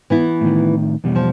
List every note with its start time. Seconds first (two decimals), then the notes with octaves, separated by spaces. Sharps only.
0.10 E3 B3 E4
0.41 A2 D#3
1.04 E2 B2 G3
1.16 F3